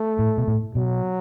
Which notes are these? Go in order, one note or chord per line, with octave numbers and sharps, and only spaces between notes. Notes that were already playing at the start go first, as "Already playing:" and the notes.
Already playing: A3
A2
B2
A2
B2 F#3